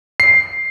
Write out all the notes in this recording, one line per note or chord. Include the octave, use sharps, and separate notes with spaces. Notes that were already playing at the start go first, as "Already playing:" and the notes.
C7